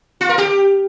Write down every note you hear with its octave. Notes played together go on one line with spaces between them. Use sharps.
F4
A#4
G4